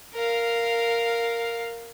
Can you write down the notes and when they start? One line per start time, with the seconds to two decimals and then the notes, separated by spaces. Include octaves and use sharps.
0.14 A#4 F5